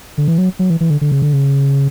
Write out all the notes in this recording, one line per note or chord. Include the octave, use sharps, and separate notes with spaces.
D3
E3
F#3
F#3
E3
E3
D3
D3
C#3
D3
C#3